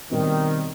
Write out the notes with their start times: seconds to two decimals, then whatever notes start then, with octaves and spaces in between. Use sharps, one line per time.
0.11 B2 D#3 G3 C4